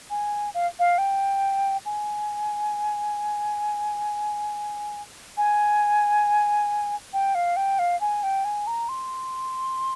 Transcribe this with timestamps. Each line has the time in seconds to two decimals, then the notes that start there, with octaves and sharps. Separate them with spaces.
0.10 G#5
0.54 F5
0.79 F5
0.98 G5
1.85 G#5
5.37 G#5
7.13 G5
7.35 F5
7.56 G5
7.79 F5
8.01 G#5
8.23 G5
8.45 G#5
8.67 A#5
8.89 C6